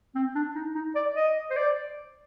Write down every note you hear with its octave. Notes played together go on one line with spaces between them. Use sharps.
C4
D4
D#4
D#4
D5
D#5
C5
D5